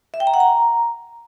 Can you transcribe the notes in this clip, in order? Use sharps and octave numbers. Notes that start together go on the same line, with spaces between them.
E5
G5
A#5
F#5
A#5